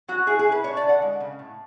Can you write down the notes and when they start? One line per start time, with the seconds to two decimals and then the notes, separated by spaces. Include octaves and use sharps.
0.08 F#3 F#4
0.27 E4 G#4
0.39 G#4
0.46 E4
0.52 B4
0.64 D4 C#5
0.77 D5
0.83 D3
0.89 F#5
1.02 G#3
1.20 C#3
1.39 A2